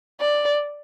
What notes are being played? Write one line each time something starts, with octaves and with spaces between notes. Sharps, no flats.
D5